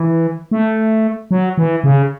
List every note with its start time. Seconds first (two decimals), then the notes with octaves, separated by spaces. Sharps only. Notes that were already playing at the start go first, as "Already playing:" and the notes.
Already playing: E3
0.51 A3
1.31 F#3
1.58 E3
1.84 C#3